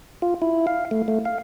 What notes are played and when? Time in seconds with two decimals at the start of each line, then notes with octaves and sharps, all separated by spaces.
0.22 F4
0.42 E4
0.67 F5
0.91 A3
1.08 A3
1.25 F5